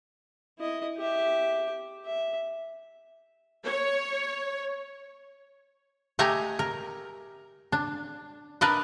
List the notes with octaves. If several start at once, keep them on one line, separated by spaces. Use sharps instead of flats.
E4 D#5
G4 E5
E5
C#5
A3 G4 D#5 G#5 A#5
A#4
D4
D4 A#4 B4 D5 D#5